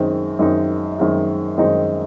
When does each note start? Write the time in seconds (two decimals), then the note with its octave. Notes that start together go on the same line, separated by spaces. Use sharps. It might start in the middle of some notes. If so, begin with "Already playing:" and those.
Already playing: F#2 D#3 G#3 C4 D#4
0.39 F#2 D#3 G#3 C4 D#4
0.99 F#2 D#3 G#3 C4 D#4
1.58 F#2 D#3 G#3 C4 D#4